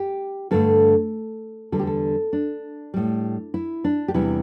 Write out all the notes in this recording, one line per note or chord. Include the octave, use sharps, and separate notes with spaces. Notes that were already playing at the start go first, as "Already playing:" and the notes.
Already playing: G4
G2 D3 A3 A4
E2 D3 G3 A4
G4
A4
D4
A2 G3
E4
D4
G4
E2 C3 G3 E4